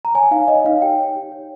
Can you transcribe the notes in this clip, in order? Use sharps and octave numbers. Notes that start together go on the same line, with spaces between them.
A#5
C#5 G#5
D#4 F5
C#5 D#5
D#4 F5
G4 G5
C#5
G4
C#5